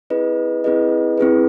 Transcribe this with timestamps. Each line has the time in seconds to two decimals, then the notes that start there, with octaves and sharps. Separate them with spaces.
0.10 C4 E4 G#4 B4 D#5
0.64 C4 E4 G#4 B4 D#5
1.18 C4 E4 G#4 B4